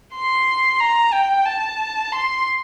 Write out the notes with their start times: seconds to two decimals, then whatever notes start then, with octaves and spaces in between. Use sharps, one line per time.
0.14 C6
0.80 A#5
1.13 G5
1.46 A5
2.12 C6